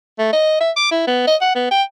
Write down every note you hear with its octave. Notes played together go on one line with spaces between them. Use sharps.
A3
D#5
E5
D6
E4
B3
D#5
F#5
B3
G5